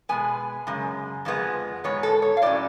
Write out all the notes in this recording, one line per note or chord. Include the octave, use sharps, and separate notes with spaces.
B2 G#3 B3 G#5
F#2 C#3 G#3
F2 F3 G#3 B3
G#2 G#3 B3 C#5
A4
C#5
F5
A2 F#3 C#4 D5